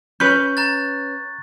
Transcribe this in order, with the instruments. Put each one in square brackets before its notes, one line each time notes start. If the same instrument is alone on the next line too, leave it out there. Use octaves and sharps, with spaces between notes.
[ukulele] C#4 B4 [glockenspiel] C#6 [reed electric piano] G6
[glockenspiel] A#5 F#6 A6